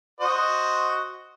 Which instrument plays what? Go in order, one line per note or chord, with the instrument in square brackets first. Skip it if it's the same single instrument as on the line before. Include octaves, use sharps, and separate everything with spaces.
[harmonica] F#4 C5 D#5